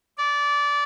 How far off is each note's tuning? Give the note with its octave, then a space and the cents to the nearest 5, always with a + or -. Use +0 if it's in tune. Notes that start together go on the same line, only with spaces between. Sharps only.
D5 -20